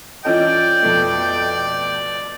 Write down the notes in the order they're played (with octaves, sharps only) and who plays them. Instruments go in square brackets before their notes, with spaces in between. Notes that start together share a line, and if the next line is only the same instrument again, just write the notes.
[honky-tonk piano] E3 C#4 A4 [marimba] F4 D#5 [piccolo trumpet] D5 [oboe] G5
[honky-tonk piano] F2 B2 A3